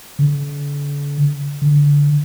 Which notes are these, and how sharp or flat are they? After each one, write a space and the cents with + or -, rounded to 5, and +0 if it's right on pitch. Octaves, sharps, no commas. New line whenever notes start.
D3 -40
D3 -20